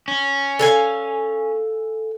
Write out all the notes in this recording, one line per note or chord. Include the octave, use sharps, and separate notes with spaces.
C#4
A4 F5 G#5